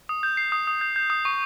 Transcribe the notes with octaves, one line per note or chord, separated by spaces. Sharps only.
D#6
G6
C7
D#6
D#6
G6
G6
D#6
C#6